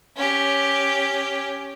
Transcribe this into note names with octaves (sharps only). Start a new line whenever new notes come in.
C#4 G4